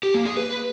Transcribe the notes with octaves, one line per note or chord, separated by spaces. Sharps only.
G4
A#3
G#4
B4